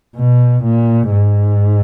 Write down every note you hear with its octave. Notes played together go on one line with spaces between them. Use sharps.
B2
A#2
G#2